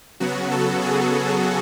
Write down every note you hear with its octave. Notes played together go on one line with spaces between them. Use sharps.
C#3 F#3 B3 F#4
A4
G#4